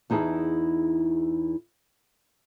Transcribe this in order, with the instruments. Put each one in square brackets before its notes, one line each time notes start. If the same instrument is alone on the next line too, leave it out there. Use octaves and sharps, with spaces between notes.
[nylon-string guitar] E2 D#4 E4 G#4 A5